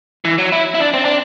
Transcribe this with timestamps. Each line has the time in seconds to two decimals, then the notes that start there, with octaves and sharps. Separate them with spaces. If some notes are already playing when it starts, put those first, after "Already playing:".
0.25 E3
0.38 F#3
0.52 E4
0.74 E4
0.80 D4
0.94 C4
1.05 D4